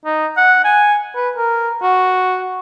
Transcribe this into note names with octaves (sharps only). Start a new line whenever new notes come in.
D#4
F#5
G#5
B4
A#4
F#4